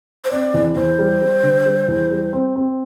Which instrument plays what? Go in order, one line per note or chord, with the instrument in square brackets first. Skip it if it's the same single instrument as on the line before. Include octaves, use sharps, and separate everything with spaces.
[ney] C5
[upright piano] C4 [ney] D5
[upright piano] E2
[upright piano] E2 [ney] C5
[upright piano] G3
G3
D3
G3
E2
G3
C4
C4